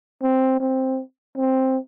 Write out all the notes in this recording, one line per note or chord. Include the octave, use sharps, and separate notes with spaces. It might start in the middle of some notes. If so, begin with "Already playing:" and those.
C4
C4
C4